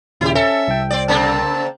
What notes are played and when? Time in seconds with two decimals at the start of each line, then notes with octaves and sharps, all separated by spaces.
0.21 D#2 A#2 C#3 E4 G4
0.35 C#4 A4 E5
0.68 C2 G5
0.90 C4 D5
1.08 C#3 A#3 C4 A5